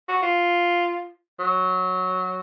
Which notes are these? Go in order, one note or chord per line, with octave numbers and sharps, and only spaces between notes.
F#4
F4
F#3